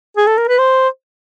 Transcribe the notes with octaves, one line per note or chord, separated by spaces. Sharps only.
G#4
A4
A#4
B4
C5